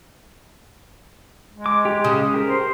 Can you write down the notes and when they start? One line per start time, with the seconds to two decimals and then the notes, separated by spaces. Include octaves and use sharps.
1.53 G#3
1.66 D6
1.85 G4
2.04 C#3 D#6
2.34 G4 A#4
2.48 C5